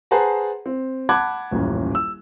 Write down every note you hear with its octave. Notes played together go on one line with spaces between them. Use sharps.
G#4 B4 C5 F#5 A5 A#5
C4
F#5 A5 B5 D6 F#6 G#6
D#1 A1 F#2
E6